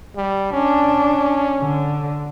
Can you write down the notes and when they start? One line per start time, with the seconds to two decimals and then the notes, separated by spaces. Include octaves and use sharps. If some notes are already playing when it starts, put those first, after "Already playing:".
0.16 G3
0.53 C#4 D4
1.60 D3